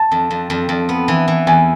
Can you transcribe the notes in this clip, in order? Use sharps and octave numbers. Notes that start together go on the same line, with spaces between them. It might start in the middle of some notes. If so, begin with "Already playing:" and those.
Already playing: A5
F2
F2
F2
F2
B3
E3
E3
E2 G#5